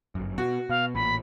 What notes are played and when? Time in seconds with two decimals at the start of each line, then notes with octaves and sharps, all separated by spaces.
0.15 G1 F#2
0.38 B2 F#4
0.69 B2 F5
0.95 A1 A#2 B5